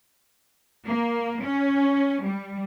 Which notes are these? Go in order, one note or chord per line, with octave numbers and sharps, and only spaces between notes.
A#3
C#4
G3